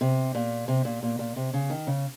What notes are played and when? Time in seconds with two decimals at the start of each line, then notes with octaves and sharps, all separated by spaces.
0.01 C3
0.35 A#2
0.68 C3
0.85 A#2
1.03 A#2
1.19 A#2
1.36 C3
1.53 C#3
1.70 D#3
1.87 C#3